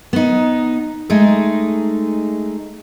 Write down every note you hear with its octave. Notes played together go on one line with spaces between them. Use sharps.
B3 D#4
G#3 A3 D#4 G#4